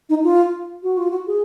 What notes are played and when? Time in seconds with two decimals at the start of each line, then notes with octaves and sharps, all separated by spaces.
0.09 D#4
0.24 F4
0.83 F#4
0.98 F4
1.11 F#4
1.27 G#4